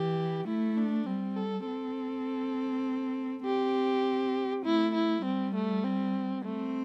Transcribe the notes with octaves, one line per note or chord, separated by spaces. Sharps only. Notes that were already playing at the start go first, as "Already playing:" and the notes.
Already playing: E3 G4
A3 E4
D4
G3 C4
A4
C4 A4
C4 G4
A3 E4
E4
G3 C4
A3
C4
A3 C4